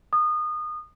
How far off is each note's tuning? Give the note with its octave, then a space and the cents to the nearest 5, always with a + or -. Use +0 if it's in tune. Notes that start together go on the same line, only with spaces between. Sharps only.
D#6 -25